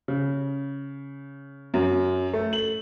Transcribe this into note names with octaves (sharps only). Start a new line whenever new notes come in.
C#3
F#2
A3
F#7